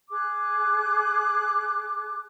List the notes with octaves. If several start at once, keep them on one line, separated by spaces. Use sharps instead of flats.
G#4 D6 F#6